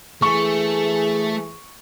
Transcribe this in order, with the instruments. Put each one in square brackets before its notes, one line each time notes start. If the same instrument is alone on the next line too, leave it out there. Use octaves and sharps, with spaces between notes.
[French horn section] E3 G#4 [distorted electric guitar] A3 [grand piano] C#6